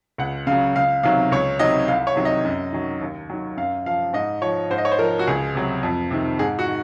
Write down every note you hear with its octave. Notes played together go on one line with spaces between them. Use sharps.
C#2 F#5
C#3 F#3 F5
C#2 F5
C3 D#3 F#3 F5
C#2 C#5
C3 D#3 F#3 D#5
C2 F5
C#5
C3 D#3 F#3
D#5
F#2
D#3 F#3
D#2
D#3 F#3
F#2 F5
F3 F5
G#2 D#5
F3 C#5
G#2 C5
D#5
C#5
C5
F3 A#4
F#4
C#2 G#4
C3 F#3
F2
C3 D#3
G#2 G#4
F#4
D#3